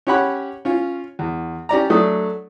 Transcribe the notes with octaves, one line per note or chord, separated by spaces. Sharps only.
C#4 G4 C#5 F#5 B5
C#4 F4
E2
C#4 G4 D5 A#5
F#3 A3 D4 D#6